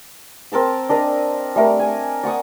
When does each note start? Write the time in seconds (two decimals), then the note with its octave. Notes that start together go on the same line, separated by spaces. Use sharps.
0.52 C4 A#4 A5 E6
0.89 D4 A#4 D#5
1.56 G3 A3 A#4
1.79 G#5
2.23 D5 F#5 C#6 D#6